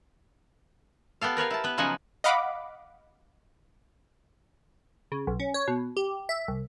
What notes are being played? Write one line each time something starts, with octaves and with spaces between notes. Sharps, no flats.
B3 G4 A4 F5
A#4 B4 C#5 F5
E4 A5
B3 B4
C#3 F3 F#3 D#4 F#5 G#5
D#5 F5 F#5 B5 D6
C#3
B1
C#4
C#5
B2
G4
E5
C2